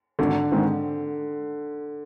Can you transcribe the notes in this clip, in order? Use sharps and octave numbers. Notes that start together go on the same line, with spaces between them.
G#1 D3
G#2 D#3 G#3 C4